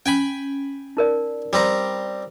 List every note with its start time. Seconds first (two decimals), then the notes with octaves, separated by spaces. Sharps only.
0.06 C#4 G5 G#5 B5
0.97 D#4 A#4 D5
1.53 G3 C4 A#5